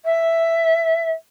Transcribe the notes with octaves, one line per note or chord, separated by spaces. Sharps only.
E5